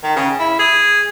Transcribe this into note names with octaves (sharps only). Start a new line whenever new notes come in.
D#3
C#3
E4
G#4